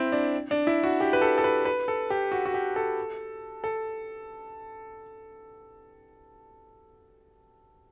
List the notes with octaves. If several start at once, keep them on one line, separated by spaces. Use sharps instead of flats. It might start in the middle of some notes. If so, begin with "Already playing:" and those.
Already playing: C4 E4
D4
D4
E4
F#4
G4
B4
A4
A4
B4
B4
A4
G4
F#4
F#4
G4
A4
A4